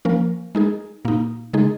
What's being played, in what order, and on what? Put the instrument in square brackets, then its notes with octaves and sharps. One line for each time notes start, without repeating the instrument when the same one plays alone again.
[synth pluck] F3 A#3 C#4 A#4
G#3 D#4 G#4
A#2 A#3 D#4
C#3 G#3 D#4 G#4